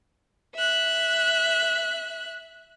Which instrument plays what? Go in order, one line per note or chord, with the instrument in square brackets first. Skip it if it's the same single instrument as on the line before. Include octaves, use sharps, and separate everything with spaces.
[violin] E5 F#6